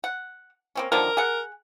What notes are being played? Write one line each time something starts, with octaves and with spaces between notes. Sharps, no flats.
F#5
A#3 C4 C#4
D3 D#3 F3 A#4
G#4 F#5